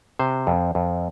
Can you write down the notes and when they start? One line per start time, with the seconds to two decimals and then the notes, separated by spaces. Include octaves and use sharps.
0.19 C3 C5
0.47 F2
0.75 F2